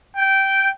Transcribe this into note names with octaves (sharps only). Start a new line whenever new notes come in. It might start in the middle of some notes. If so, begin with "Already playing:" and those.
G5